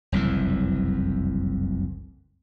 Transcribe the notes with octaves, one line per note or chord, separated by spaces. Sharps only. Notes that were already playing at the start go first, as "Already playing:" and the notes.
F#1 C2 F2 E3